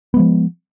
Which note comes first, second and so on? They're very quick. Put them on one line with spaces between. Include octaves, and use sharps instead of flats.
B3 G#3 F3